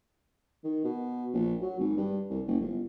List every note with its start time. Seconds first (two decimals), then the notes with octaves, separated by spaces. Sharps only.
0.64 D#3
0.84 B2
1.33 A#1
1.61 F#3
1.79 G#1
1.97 G2
2.30 C2
2.47 F#1
2.60 G1